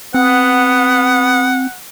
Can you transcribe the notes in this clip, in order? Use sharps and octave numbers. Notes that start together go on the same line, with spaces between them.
B3 C4 F#5